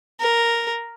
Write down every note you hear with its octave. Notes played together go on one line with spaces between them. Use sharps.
A#4